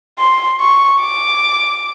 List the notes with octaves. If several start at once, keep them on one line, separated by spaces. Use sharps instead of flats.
C6
C#6
D6